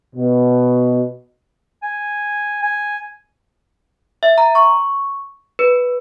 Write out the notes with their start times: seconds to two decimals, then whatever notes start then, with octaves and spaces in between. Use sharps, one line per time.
0.15 B2
1.83 G#5
2.62 G#5
4.23 E5
4.38 A#5
4.55 C#6
5.59 B4